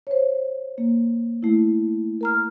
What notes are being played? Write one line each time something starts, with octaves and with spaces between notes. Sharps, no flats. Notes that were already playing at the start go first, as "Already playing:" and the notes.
C5 C#5
A#3
A3 E4
A#4 A#5 F6